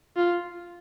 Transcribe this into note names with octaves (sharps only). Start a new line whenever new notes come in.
F4